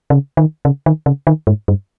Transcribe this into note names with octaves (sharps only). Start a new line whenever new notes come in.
C#3
D#3
C#3
D#3
C#3
D#3
G#2
G2